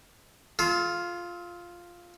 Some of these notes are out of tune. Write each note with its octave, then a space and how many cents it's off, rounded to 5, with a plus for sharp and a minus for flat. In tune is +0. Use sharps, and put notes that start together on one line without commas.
F4 +0 A4 -40